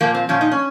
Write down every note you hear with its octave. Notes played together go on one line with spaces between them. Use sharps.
A#2 F3 A#3
C4
A#2 F3 C#4
D#4
C#4